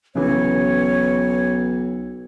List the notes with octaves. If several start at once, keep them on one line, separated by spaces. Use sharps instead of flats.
B1 C#3 E3 C#5